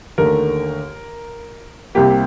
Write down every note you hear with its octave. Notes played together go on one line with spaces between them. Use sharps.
D#2 D3 A3 A#4
C2 C3 G3 A#3 G4